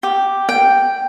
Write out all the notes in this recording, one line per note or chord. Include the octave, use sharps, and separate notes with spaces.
G4
G5